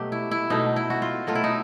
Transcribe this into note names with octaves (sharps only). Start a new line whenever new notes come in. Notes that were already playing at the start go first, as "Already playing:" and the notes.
Already playing: B2 F#3 A3 G4
E4
E4
B2 F#3 A3 D#4
E4
F#4
F4
B2 F#3 A3 F4
E4
D#4